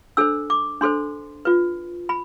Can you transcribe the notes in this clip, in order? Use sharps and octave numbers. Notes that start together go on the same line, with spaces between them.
D4 A4 C5 E6
D6
D4 A4 C5 C6
F4 B4
B5